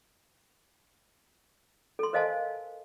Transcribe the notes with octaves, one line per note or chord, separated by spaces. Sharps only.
A4 C6
A#4 C5 D#5 F5 G#5 A5